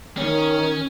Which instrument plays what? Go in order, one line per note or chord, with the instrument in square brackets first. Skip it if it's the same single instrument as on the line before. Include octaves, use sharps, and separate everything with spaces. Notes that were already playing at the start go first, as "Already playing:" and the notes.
[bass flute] D#3 [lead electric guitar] C#4 C#5